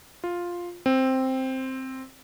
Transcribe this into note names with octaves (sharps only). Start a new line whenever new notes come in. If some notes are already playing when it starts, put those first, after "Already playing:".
F4
C4